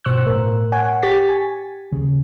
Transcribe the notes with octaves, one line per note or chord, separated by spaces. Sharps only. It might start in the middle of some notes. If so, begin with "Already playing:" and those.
G1 B2 C5 C#6 E6 F#6
A2 A#4
C#5 F#5 G#5
G4 C#6 A6 B6
G#5
D#2 C#3